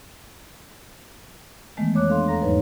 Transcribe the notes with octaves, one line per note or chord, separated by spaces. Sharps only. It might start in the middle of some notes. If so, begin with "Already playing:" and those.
D#3 E3 G#3 A3 B3
F2 A#3 C#5 D6 F#6
D4 A4 F5 C6
E2 A4 F5 A#5 A#6
F2 G#2 F#3 D#4 B4 C#5